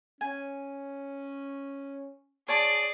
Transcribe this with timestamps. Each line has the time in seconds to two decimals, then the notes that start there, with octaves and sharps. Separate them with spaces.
0.21 C#4 G#5
2.48 G#4 C#5 D5 A5 C#6